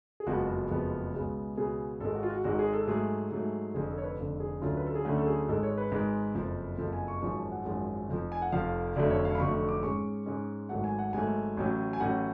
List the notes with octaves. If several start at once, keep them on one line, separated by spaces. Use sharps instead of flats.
G#4
F#1 F2 F3 G#3 B3 F#4
F#4
F#1 F2 F3 G#3 B3
C#2 B2 G#3 B3
C#2 B2 G#3 B3 G#4
G#1 G#2 G#3 A4
F#4
F4
F#4
G#1 G#2 G#3 F#4
G#4
A4
G#2 F#3 A3 G#4
G#2 F#3 A3
F1 F2 D3 G#4
A4
C#5
B4
F1 F2 D3 A4
G#4
D2 D3 F#3 A3 C#4 F4
B4
A4
G#4
D2 D3 F#3 A3 C#4 F#4
A4
G#4
G#1 G#2 G#3 A4
C#5
B4
G#1 G#2 G#3
F#1 F2 F3
F#1 F2 F3 A4
G#5
C#6
G#1 F#2 F3 G#3 C#6
A5
F#5
G#1 F#2 F3 G#3
F1 F2 F3
G#5
F#5
F1 F2 F3 F5
F1 F2 D3 F#3 A3 D5
C#5
F5
B5
F1 F2 D3 F#3 A3 C#6
C#6
D6
G#2 G#3 C#4 C#6
G#2 G#3 C#4
G#1 G#2 F#3 A3 F#5
G#5
F#5
G#1 G#2 F#3 A3 G#5
A1 A2 F#3 C#4
G#5
A1 A2 F#3 C#4 F#5